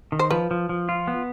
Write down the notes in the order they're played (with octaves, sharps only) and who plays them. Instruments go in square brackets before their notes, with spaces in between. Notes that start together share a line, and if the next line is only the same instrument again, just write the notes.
[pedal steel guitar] D#3
[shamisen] C5
[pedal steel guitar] F3 [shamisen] B4
[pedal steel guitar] F3
F3
F4
B3